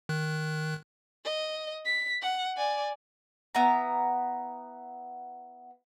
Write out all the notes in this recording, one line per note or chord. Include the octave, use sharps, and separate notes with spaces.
D#3 F#6
D#5
B6
F#5
D5 G#5
B3 E4 A#5